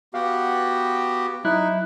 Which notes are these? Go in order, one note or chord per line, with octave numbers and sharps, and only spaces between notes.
B3 F#4 G4 F5
F#3 D#4 E4 F#6